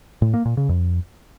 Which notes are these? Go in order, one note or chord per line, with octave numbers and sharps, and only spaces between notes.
A2
A#3
A#2
C#3
F2